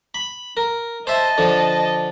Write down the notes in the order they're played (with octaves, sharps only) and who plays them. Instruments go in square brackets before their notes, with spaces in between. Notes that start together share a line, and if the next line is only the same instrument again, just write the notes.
[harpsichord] B5
A#4
[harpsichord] C5 E5 [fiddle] D#5 A5
[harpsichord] D3 F3